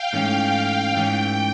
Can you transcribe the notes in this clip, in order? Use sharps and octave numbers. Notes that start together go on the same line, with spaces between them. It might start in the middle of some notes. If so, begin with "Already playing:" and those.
Already playing: F5 G5
G#2 E3 A3 C#4
G#2 E3 A3 C#4 G5